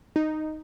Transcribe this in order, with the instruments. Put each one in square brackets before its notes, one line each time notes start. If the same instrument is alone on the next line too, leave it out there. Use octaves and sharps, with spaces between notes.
[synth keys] D#4